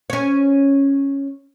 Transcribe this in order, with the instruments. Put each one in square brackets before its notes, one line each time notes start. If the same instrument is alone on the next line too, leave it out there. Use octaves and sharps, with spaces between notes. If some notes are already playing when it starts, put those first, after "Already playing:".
[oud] C#4 C#5